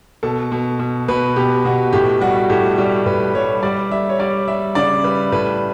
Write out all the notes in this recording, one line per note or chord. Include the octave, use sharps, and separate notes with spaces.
B2 A4
B2
B2
B2 B4
B2 G4
B2 F#4
A2 G4
G3 F#4
A2 G4
G3 G4
A2 B4
G3 C#5
G3 D5
G3 E5
C#5
G3 D5
G3 E5
C#3 D5
G3 B4
A2 B4